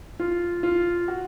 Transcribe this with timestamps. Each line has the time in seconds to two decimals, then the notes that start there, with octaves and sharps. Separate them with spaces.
0.20 F4
0.63 F4
1.08 F#4